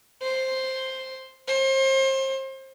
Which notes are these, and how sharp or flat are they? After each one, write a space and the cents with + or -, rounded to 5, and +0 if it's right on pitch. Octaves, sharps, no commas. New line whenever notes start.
C5 +5
C5 +35